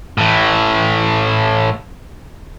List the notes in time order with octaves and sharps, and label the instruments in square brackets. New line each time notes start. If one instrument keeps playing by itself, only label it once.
[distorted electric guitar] A2 E3